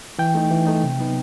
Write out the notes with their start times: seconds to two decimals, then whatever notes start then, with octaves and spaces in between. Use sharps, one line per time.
0.19 E3 G5
0.35 A3 D#4
0.51 E3
0.67 A3 D#4
0.83 C3
0.99 F#3 B3 D#4